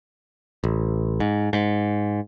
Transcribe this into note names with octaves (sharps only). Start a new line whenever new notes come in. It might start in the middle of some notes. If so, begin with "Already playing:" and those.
A1
G#2
G#2